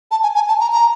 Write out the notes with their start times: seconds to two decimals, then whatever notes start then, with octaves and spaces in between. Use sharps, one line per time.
0.11 A5
0.23 G#5
0.35 G#5
0.48 A5
0.60 A#5
0.73 A#5